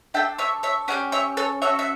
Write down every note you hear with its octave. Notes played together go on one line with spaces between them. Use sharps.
D4 A4 E5 G5
C#5 E5
C#5 E5
C#4 E4 G4 D5 F#5
C#5 E5
A4 C#5
C#4 F#4 A4 C#5 E5
E5